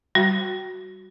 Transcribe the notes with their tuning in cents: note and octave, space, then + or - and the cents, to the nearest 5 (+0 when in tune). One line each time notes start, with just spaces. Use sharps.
G3 -25 F#4 +0